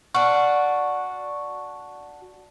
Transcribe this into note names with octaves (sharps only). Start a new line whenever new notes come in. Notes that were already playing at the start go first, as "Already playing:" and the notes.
D4 F#4 C#6